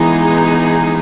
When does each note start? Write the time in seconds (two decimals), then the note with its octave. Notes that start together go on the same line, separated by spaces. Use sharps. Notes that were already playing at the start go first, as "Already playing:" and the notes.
Already playing: E3 G#3 B3 D#4 G#4